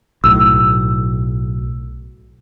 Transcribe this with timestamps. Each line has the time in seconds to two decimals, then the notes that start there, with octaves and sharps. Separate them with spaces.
0.24 B1 A2 E6